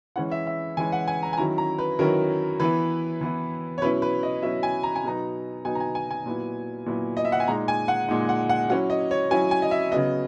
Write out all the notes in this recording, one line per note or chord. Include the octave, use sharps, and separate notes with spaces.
E3 G#3 C#4 E4 F#5
E5
E5
E3 G#3 C#4 E4 G#5
F#5
G#5
A#5
G#5
D#3 F#3 C#4 E4 A#5
A#5
B4
D#3 F#3 C#4 E4 A#4
E3 B3 E4 B4
E3 B3 E4
C#5
B2 F#3 C#4 E4 B4
B4
D#5
B2 F#3 C#4 E4 E5
G#5
A#5
G#5
B2 F#3 B3 D#4 A#5
B2 F#3 B3 D#4 G#5
A#5
G#5
G#5
G#5
A#2 F#3 B3 E4
A#2 F#3 B3 E4
D#5
E5
F#5
G#5
A#2 G#3 D#4 A#5
G#5
F#5
A#2 G#3 D#4
F#5
F#5
F#3 C#4 E4 F#5
D#5
C#5
F#3 C#4 E4 G#5
G#5
D#5
E5
C#3 F#3 B3 D#5